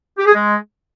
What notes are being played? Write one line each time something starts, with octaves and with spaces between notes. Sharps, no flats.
G4
G#4
G#3